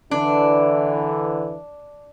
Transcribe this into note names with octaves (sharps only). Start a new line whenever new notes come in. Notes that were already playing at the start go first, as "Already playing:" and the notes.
D3 E3 D4